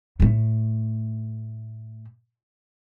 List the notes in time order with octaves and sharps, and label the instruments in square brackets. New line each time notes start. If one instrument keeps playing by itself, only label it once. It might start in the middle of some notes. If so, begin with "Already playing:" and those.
[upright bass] A2 A3